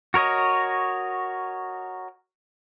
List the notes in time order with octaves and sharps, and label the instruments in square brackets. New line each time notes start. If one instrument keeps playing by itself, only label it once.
[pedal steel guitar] F#4 A#4 C#5 D#5